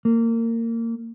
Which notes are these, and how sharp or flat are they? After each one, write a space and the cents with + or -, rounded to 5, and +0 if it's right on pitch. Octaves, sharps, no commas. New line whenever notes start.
A#3 -25